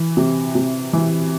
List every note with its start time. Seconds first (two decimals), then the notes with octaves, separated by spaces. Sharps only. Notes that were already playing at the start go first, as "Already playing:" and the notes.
Already playing: E3
0.17 C3
0.55 C3
0.93 E3